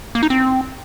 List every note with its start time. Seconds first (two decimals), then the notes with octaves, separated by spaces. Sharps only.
0.15 A#3
0.23 D#4
0.30 C4